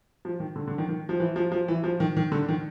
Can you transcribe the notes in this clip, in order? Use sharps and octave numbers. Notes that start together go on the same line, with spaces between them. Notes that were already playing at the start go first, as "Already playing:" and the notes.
F3
D#3
D3
D3
D#3
D#3
F3
E3
F3
F3
E3
F3
D#3
D#3
D3
D#3